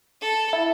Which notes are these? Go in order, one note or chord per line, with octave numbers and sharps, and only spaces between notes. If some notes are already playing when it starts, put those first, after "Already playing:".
A4
E4